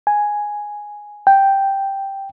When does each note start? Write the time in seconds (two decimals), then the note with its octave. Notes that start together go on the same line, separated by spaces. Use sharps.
0.07 G#5
1.27 G5